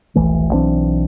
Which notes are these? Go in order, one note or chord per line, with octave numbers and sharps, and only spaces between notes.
D#1 A#1 E3 A3
B1 E3 C4 D4